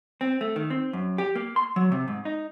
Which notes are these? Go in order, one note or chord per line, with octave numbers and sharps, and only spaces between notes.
C4
A3
D#3
C4
F#2
G4
A#3
C6
F#3
C3
G#2
D#4